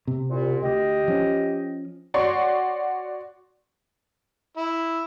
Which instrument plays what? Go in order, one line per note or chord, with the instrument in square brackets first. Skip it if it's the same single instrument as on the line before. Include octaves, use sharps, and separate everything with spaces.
[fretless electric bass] C3
[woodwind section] C2 A#2
[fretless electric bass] D2 [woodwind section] G4 D#5
[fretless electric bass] F3 C#4
[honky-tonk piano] F#4 C#5 D5 F#5 C6 C#6
[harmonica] E4